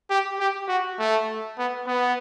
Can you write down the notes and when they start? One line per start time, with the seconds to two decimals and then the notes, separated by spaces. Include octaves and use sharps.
0.10 G4
0.39 G4
0.69 F#4
0.99 A3
1.58 B3
1.87 B3